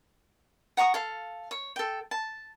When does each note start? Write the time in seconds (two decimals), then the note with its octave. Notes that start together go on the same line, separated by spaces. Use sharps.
0.77 F#5 A#5 C#6 D#6
0.94 A4 F5
1.51 C#5
1.76 A4 G5
2.11 A5